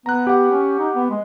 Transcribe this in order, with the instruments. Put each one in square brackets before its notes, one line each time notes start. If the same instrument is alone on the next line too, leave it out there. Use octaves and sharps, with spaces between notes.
[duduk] B3 [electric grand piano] A#5 F#6
[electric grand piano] G4 F#5
[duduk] C#4
D#4
B3
G#3